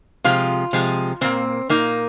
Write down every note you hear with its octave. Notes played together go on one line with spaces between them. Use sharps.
C3 F3 G#3 F4
C3 F3 G#3
A#2 A#3 C4
A#2 A#3 D#4